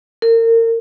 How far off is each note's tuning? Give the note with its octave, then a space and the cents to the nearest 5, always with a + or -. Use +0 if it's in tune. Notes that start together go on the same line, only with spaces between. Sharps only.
A#4 -30